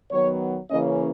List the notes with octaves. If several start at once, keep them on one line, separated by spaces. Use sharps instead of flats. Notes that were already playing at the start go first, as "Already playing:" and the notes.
D#3 F#3 B3 C#5
C#3 E3 A#3 C#4 D#5